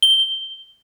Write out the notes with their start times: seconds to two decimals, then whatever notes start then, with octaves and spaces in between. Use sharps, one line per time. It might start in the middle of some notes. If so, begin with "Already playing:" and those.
0.02 G7